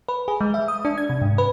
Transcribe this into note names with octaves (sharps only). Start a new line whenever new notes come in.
B4
G#4
G#3
E5
D#6
D4
G#6
C3
G#2
B4